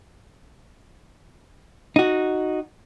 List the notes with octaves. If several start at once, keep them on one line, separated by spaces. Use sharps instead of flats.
D#4 F#4